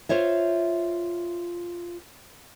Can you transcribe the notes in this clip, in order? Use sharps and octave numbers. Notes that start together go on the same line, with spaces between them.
F4 C5 C#5 E5